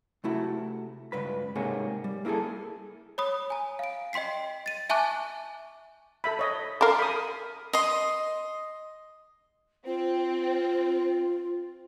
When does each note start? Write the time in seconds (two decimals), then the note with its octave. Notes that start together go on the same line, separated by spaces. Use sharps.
0.24 C3 A3 E4 F#4
1.12 C#2 G2 B4 B5
1.55 G#2 C3 A#3 G#4 C#5
2.04 G3
2.25 A#3 E4 F#4 G#4 A4
3.18 C#5 B5 D#6
3.50 G#5 A#5
3.79 F5 D7
4.13 D#5 G5 C6 B6 C7
4.66 A6 D#7
4.89 E5 G#5 A5 C#6 D6 F#6
6.24 A4 E5 B5
6.39 C#5 D#5
6.81 A4 A#4 F5 C6 D6
6.99 B5 D#6
7.73 D#5 C6
9.86 C4 F4